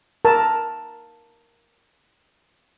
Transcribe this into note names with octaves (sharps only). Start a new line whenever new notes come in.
A#4 A5